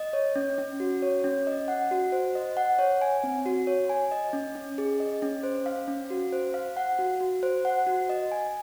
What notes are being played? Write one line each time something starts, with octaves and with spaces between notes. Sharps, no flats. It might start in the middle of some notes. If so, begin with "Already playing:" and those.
Already playing: D#5
C#5
C#4
C#4
F#4
C#5
C#4
D#5
F#5
F#4
C5
D#5
F#5
C#5
G#5
C4
F#4
C#5
G#5
D#5
C#4
C#4
G#4
D#5
C#4
C5
F5
C#4
F#4
C5
F5
F#5
F#4
F#4
C5
F#5
F#4
D#5
G#5